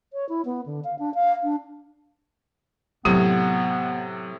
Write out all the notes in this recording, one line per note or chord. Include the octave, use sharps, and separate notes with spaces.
C#5
E4
B3
D3
F5
D4
F5
D4
A2 C3 F#3 B3 G4